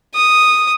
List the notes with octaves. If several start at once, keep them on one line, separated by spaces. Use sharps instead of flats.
D#6